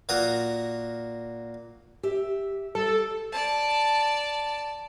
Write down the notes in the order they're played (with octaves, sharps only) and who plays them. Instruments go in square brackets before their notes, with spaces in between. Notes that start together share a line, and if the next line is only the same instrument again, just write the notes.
[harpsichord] A#2 F#4 A#4 D#6
[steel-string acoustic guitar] G4 E5
[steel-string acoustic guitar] G3 [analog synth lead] A4
[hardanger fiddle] D5 A5